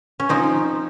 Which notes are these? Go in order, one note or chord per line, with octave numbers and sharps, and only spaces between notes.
C#4
F3 C4 D#4